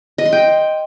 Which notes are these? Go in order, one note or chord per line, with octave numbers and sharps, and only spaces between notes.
D#5
C6
G5